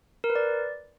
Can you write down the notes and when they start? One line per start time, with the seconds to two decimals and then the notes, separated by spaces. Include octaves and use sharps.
0.24 A#4
0.30 B4
0.35 D5